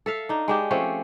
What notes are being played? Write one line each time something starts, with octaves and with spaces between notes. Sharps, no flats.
A4 E5 F5
D4 D#4
G#3 D4 G4
F3 A3 C4 C#4